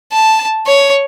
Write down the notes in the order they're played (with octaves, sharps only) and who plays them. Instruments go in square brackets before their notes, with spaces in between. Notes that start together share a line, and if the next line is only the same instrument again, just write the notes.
[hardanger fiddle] A5
C#5